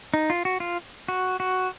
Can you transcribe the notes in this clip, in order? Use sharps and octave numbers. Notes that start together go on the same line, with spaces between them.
D#4
F4
F#4
F4
F#4
F#4